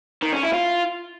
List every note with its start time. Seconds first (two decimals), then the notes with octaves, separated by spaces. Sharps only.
0.23 D#3
0.33 C#4
0.44 E4
0.54 F4